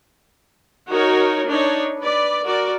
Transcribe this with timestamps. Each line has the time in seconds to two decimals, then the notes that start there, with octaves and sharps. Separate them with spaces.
0.90 D#4 F#4 A#4 C#5
1.50 D4 D#4 C#5
1.99 B4 D5
2.44 F#4 A#4 D5